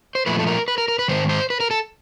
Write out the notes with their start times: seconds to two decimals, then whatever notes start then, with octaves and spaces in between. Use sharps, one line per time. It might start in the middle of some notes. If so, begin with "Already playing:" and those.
0.15 C5
0.26 A#2 F3 A3 B4
0.39 A4
0.47 A#4
0.68 B4
0.78 A#4
0.88 A#4
0.99 B4
1.08 G#2 D#3 C5
1.29 C5
1.50 B4
1.60 A#4
1.71 A4